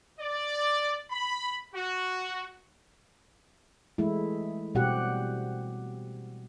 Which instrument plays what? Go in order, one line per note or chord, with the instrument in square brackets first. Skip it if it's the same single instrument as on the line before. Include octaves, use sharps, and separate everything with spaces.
[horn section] D5
B5
F#4
[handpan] E3 G#3 A3 E4
B2 G3 C4 F#4 G4 F#5